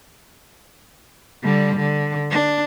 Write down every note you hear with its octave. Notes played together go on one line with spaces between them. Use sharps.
D3 G3
D3
D4